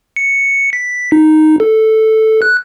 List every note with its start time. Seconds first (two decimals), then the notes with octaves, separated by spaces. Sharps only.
0.16 C#7
0.73 B6
1.12 D#4
1.60 A4
2.42 F#6